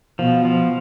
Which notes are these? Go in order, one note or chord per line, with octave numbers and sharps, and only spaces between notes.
B2 F3
F3